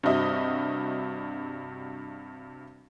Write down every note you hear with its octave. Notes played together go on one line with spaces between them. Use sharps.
G2 C3 F#4 D#5 E5